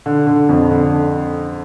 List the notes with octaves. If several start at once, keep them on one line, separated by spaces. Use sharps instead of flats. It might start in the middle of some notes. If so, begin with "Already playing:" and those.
D3
D3
F2
D3